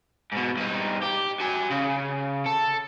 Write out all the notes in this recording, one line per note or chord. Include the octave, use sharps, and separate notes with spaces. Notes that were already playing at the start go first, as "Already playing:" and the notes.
G#2 B2
G2 D#4
G4
F#4 G#5
C#3
A4